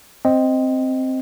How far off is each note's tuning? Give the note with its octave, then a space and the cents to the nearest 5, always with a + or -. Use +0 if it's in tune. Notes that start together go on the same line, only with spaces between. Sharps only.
C4 +0 D#5 +0